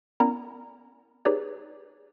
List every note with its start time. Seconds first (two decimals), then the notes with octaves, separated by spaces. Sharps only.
0.20 B3 C#4 E4 A#4 D5 A#5
1.25 D#4 G4 G#4 B4 C#5 D5